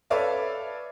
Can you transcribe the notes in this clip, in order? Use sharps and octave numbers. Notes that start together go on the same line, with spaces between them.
A4 B4 C#5 D5 E5 F5